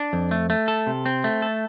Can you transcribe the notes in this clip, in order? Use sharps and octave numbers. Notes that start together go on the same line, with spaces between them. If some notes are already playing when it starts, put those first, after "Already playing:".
Already playing: D4
F2
A3
A3
A4
C3
C4
A3
A4